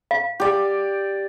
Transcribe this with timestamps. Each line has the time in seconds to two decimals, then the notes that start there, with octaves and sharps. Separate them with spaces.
0.11 F5
0.40 G4 D5